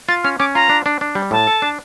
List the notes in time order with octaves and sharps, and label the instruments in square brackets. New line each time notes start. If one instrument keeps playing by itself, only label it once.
[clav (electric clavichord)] F4 [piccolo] A6
[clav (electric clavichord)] C#4 [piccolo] F6
[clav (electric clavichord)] C#4 [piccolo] D6
[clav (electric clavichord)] F4 [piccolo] A#5
[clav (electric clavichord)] D4
D4
D4
G3
[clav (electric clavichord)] A2 [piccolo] A5
[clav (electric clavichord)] A4
D4